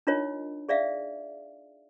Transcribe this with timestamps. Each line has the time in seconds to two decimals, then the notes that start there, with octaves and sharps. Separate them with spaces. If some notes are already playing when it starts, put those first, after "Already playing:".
0.07 D4 D#4 F4 A#4 C#5 D#5
0.69 G#4 D5 E5 F5